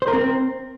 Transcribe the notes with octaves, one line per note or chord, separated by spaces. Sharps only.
C5
A#4
C4